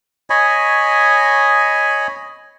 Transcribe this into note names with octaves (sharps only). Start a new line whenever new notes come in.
C#5 D#5 G#5 B5